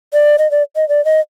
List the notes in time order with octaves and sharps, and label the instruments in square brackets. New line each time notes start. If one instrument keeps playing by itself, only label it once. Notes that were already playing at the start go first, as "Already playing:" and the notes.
[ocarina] D5
D#5
D5
D#5
D5
D#5